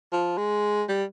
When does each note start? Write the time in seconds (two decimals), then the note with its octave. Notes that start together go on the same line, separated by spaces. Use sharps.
0.12 F3
0.38 G#3
0.89 G3